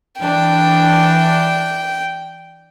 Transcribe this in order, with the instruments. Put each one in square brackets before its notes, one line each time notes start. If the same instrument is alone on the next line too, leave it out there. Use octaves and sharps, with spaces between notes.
[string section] E3 D4 [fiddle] G5